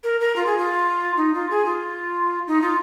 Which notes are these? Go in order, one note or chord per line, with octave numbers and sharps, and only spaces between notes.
A#4
A#4
F4
G#4
F4
D#4
F4
G#4
F4
D#4
F4